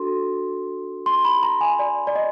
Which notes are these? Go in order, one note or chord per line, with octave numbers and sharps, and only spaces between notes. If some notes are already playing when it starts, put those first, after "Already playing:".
Already playing: D4 F#4 A4 C6
C6
B5
A#5
G#5
D5
D5
D#5